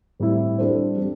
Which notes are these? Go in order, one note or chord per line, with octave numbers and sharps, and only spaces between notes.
A2 G3 C4 E4
G3 D4 A4 C5
G3 C4